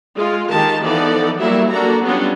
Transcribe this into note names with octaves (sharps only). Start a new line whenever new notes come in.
G#3 F4
D#3 G#3 G4 A#4 A5
E3 F3 B3 D#4 A4 D5
F#3 G3 A#3 E4 A#4 E5
A#3 D4 F#4 A4 D5 A#5
F#3 G3 B3 C#4 D4 F4